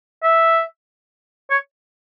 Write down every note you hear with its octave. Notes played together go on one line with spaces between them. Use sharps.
E5
C#5